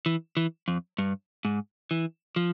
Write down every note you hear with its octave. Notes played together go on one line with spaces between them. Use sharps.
E3
E3
F2
G2
G#2
E3
F3